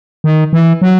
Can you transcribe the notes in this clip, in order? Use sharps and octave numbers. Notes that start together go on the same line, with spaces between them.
D#3
E3
F#3